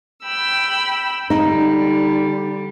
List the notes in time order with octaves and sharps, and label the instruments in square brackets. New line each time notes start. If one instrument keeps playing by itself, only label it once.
[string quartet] G5 B5 E6
[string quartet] D3 G3 [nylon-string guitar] D#4